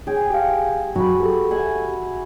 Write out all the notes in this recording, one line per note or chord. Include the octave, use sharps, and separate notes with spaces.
G#4 C#5 G5
G4 F5
F#2 F#3 F#4 B5
G4 A4
E5 F#5 G#5